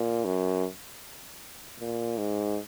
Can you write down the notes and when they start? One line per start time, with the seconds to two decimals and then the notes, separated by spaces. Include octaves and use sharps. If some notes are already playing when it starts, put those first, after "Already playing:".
Already playing: A#2
0.25 F#2
1.79 A#2
2.18 G#2